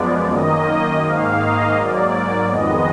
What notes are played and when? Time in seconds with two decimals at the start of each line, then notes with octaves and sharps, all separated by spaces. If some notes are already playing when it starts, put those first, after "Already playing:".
Already playing: F#2 F3 G#3 B3 D5
0.30 F#2 D#3 A#3 D#5
1.03 G#2 D#3 A#3 F5
1.40 D#5
1.76 G#2 F#3 A#3 D5
2.49 F2 D#3 G#3 B3 D#5